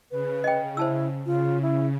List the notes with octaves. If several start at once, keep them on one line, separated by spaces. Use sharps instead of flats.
C#3 B4
D#5 G5
E4 C5 A5 E6
C#3 F4
E4